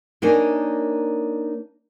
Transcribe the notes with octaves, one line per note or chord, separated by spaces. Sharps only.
A#3 D4 D#4 A#4 C#5 G#5